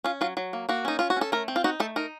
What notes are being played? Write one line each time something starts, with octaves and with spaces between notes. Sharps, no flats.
C#4 F4
F#3 F4
F#3
A#3
A#3 F#4
C#4 D#4
C#4 F4
F#4
C#4 A4
A3 A#4
C4
F4
D#4 F#4
A3 A4
D#4 A#4